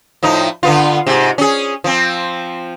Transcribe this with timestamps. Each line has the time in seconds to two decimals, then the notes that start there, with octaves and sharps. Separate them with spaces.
0.23 A2 F3 D#4
0.63 D3 B3 F4
1.07 G#2 C3
1.38 C#4 G#4
1.84 F3 C4